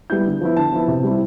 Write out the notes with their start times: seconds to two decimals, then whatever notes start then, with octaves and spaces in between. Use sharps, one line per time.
0.10 G3 B3 E4 G6
0.25 D3
0.41 F3 B3 E4
0.57 D3 A5
0.73 F3 B3 E4
0.88 C3
1.04 G3 C4 E4